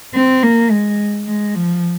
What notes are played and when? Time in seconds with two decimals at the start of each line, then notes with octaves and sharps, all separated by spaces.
0.14 C4
0.43 A#3
0.71 G#3
1.27 G#3
1.55 F3